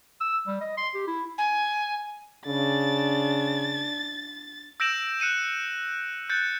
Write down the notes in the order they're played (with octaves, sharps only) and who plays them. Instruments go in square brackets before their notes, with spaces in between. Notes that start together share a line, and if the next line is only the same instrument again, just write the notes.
[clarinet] E6
G3
D#5
C6
G4
E4
[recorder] G#5
[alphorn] C#3 [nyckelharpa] D4 [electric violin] A6
[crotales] E6 G6 A#6 D7 E7 F#7
F#6 C#7 D#7 E7
F#6 G6 A6 C#7